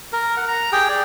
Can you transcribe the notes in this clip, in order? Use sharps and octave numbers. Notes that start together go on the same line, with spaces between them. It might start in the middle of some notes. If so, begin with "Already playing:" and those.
A#4
F#5
A#5
G4 G#4 G5
D5